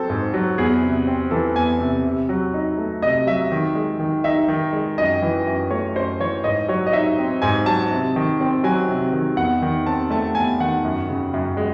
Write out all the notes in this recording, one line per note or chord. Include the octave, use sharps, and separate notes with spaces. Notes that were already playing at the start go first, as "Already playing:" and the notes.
Already playing: F#3 C4 A4 C5
G#2
F#3
E2 G#4
C3
C4
E3 A4
E2 G#5
C3
C3
F#3
D#4
A3
C3 D#5
F#3 E5
D#3
G#3
D#3
D#4 E5
D#3
G#3
F#2 D#5
E3
F#2
A3 C#5
F#2 C5
E3 C#5
G#2 D#5
F#3 C#5
D#5
D#4 E5
C4
G#2 G#5
F#3 A5
C3
D#3
C4
F#3 G#5
C3
D#3
E2 F#5
D#3
C4 A5
A3 A5
E2 G#5
D#3 F#5
F#2
C#3
F#2
G#3